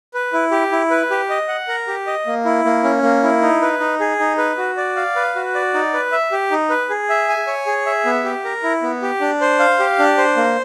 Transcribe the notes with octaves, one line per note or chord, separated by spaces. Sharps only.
B4
E4
G4
E4
B4
G4
D#5
F#5
A#4
G4
D#5
A#3
E4
A#3
C#4
A#3
E4
D#4
B4
D#4
G#4
D#4
B4
F#4
D5
F5
B4
F#4
D5
D#4
B4
E5
G4
D#4
B4
G#4
E5
G#5
C#5
G#4
E5
B3
G4
A#4
E4
B3
G4
D4
C5
F5
G4
D4
C5
A#3